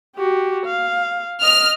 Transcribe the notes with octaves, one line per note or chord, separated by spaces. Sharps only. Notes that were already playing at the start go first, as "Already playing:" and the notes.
F#4 G4
F5
D#5 F6